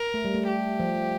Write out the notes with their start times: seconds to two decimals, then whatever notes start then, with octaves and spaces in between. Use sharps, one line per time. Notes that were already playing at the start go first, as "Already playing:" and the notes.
Already playing: A#4
0.14 A3
0.25 G3
0.34 A3
0.47 G4
0.80 F3